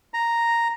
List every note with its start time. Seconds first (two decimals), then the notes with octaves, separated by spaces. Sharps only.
0.14 A#5